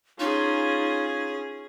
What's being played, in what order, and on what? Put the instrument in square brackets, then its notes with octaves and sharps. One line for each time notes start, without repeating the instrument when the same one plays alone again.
[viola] C#4 G#4 [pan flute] D#4 [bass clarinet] F4